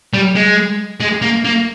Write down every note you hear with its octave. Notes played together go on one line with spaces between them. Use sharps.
G3
G#3
G#3
A#3
A#3